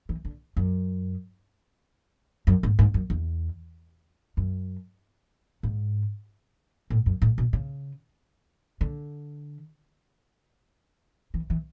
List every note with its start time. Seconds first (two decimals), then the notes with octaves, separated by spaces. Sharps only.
0.09 E3
0.25 D3
0.57 F#2
2.47 F#2
2.63 G#2
2.79 G#2
2.94 F#2
3.10 E2
4.37 F#2
5.63 G#2
6.90 A2
7.06 F#2
7.22 A2
7.38 B2
7.53 C#3
8.81 D3
11.34 E3
11.50 E3